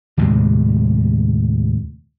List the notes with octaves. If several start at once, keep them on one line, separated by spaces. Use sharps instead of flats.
D#2 A2 C3 G#3